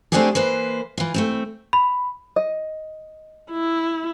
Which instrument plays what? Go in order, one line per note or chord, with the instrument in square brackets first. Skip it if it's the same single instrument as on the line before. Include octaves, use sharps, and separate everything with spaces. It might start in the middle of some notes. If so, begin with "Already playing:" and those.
[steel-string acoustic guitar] A3 C4 D4 E4 G4 G#4
E3 A#3 B4 C5
E3 F4
A3 A#3 C4
[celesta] B5
[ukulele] D#5
[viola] E4